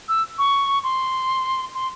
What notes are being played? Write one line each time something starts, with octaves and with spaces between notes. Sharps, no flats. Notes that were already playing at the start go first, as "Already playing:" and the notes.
E6
C#6
C6
C6